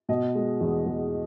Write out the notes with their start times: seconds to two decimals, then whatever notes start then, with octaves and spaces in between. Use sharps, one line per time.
0.09 B2 D#5
0.35 G#3
0.61 E2
0.86 E2